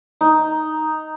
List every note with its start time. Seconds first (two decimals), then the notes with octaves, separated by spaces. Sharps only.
0.21 D#4